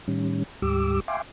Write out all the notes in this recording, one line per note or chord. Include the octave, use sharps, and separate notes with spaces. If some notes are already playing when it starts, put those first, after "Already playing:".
A2 D#3 G3 C#4
D2 G#2 G3 G4 D6 E6
E5 F5 G5 G#5 C6 D6